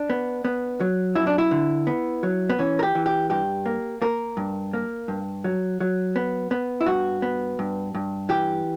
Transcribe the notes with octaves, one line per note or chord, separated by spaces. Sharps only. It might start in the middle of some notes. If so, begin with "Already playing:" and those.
Already playing: D4
B3
B3
F#3
F#2 E4
D4
E4
D3
B3
F#3
B3
E3 C#4
A#4
G4
E3
G4
G2 G4
A#3
A#3 A#4
G2
A#3
G2
F#3
F#3
B3
B3
E4
G2 F#4
B3
G2
G2
E3 G4